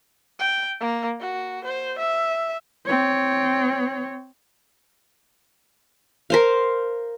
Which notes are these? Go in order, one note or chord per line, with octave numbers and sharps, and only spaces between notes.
G5
A#3
F#4
C5
E5
C4 C#5
A#4 C5 F5